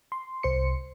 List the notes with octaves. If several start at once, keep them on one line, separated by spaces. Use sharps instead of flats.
C6
C2 C5 C6 C#7